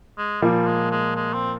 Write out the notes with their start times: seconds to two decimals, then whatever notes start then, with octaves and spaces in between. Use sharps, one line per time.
0.18 G#3
0.42 A#2 F3 G3 A#3
0.66 G#3
0.91 G#3
1.16 G#3
1.34 C4